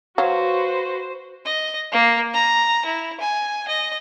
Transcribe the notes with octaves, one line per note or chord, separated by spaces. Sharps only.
F#3 F#4 B4 C5 F5
D#5
A#3
A#5
E4
G#5
D#5